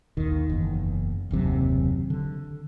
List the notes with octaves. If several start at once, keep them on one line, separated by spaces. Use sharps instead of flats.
A#1 D#2 D#3
F#1 E2
F#1 D#2 C3 F#3
D3